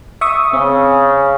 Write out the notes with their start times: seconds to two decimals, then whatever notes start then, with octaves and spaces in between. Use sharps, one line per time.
0.21 E5 C#6 D#6
0.53 C#3 C4